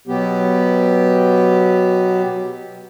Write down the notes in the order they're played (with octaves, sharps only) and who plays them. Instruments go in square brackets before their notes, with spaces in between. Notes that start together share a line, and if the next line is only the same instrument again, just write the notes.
[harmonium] B2 F#3 B3 G4